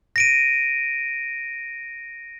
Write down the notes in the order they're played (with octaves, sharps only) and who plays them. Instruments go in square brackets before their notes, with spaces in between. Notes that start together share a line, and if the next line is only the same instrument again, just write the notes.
[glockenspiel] A#6 D7 D#7